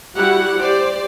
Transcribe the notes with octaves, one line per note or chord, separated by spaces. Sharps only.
G3 E4 F#4 G4 F#5
G4 C5 D5